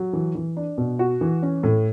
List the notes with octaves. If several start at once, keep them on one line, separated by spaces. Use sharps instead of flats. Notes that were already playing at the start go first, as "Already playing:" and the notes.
Already playing: F#3
E3
E3
D4
B2
F#4
E3
C#4
A2